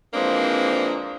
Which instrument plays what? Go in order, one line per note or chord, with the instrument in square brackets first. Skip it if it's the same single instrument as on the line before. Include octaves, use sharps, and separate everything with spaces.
[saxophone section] E3 F3 G#3 A#3 C4 D4